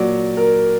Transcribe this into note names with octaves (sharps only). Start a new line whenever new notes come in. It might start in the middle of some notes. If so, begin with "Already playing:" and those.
Already playing: A#2 F#3 D5
A#4